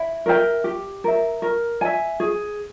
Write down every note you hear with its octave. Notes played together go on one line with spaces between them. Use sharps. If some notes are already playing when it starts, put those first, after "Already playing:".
Already playing: E4
A#4 E5 G5
G4
A#4 E5
A#4
E5 G#5
G#4